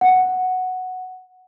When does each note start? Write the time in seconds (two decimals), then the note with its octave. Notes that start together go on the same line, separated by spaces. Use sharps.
0.01 F#5